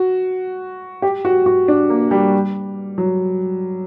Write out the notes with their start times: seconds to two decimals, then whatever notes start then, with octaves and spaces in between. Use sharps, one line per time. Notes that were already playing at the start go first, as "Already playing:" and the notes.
Already playing: F#4
1.02 G4
1.25 F#4
1.46 F#4
1.68 D4
1.90 A#3
2.11 G3
2.98 F#3